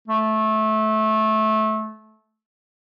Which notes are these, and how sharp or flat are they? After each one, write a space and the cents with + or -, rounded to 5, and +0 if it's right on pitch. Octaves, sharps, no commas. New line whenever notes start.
A3 -15